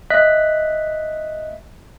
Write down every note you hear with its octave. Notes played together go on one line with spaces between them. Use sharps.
D#5 E5 F#6 B6